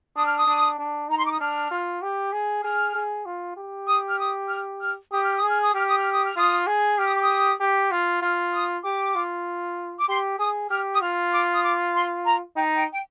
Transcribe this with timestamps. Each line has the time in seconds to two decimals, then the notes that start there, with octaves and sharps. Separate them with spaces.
0.15 D4 D#6
0.27 F6
0.37 D#6
0.47 D4
0.78 D4
1.09 D#4 A#5
1.18 C6
1.25 D6
1.33 D#6
1.40 D4 F6
1.71 F4
2.02 G4
2.33 G#4
2.64 G#4 F6
2.95 G#4
3.26 F4
3.57 G4
3.88 D#6
4.08 F6
4.19 D#6
4.50 F6
4.81 F6
5.12 G4 D#6
5.25 F6
5.37 D#6
5.43 G#4
5.49 F6
5.61 D#6
5.74 G4 F6
5.86 D#6
5.99 F6
6.12 D#6
6.25 F6
6.36 F4 D#6
6.67 G#4
6.98 G4 F6
7.07 D#6
7.15 D6
7.23 D#6
7.60 G4
7.91 F4
8.22 F4 F6
8.53 D#6
8.84 G4 D6
9.15 F4
9.99 D6
10.08 G4 C6
10.39 G#4 D#6
10.70 G4 F6
10.94 D#6
11.01 F4 F6
11.32 D6
11.55 D#6
11.63 D6
11.94 C6
12.25 A#5
12.56 D#4 G5
12.77 G5
12.93 G5